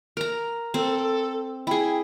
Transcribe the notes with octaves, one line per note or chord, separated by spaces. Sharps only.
A#4 A#5
C4 A4
E4 G#4 G5